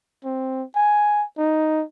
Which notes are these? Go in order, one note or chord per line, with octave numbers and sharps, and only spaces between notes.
C4
G#5
D#4